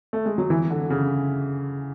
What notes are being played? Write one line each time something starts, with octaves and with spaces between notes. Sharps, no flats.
A3
G#3
F#3
E3
D3
C#3